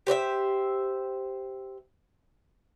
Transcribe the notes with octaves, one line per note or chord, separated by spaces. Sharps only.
G4 C5 D5 E5